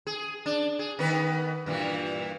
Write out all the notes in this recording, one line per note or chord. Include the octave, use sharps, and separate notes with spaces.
G#4
D4
G#4
D#3 B3 B4
G2 A#2 E3